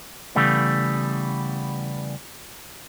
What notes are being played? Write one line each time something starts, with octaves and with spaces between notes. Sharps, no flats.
C#3 E3 G3 A3 B3